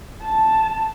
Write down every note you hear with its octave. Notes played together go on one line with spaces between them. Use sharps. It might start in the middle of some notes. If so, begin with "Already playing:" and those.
A5